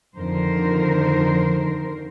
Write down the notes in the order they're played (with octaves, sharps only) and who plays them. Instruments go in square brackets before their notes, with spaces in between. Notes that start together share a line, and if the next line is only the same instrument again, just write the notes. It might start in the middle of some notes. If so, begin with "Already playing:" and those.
[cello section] F2 D3 D#3 A#4 C5